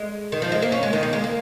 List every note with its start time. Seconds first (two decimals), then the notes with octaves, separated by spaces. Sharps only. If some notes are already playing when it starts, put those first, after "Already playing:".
Already playing: G#3
0.32 D#3
0.42 F3
0.52 G#3
0.62 A#3
0.72 C#4
0.83 G#3
0.93 D#3
1.03 A#3
1.13 G#3
1.24 A#3